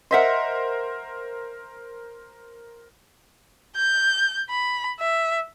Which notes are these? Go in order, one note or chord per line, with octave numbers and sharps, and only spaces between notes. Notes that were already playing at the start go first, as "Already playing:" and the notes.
A#4 C5 D#5 E5 F#5 C6
G6
B5
E5